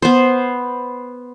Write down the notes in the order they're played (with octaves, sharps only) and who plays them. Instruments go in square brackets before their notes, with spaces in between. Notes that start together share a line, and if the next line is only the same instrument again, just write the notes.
[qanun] B3 C5